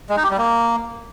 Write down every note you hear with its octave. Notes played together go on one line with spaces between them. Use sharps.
G#3
D#4
G4
G3
A#3